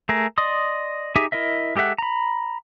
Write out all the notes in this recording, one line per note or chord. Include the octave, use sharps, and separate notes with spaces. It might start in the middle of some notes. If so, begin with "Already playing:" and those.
A3 G#4 A#4
D5 D#5 C6 D#6
D#4 G4 G#4 E5
E4 A#4 D#5 E5
G#3 G4 A4 E5 F#5
A#5 B5